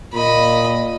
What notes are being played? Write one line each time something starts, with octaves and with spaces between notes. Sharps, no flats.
A#2 D#5 B5